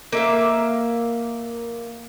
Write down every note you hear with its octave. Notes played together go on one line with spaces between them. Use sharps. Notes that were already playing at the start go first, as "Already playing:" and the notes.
A#3 E5 F5